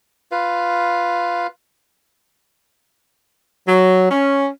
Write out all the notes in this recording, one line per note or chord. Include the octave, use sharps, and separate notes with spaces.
F4 B4 F5
F#3
C#4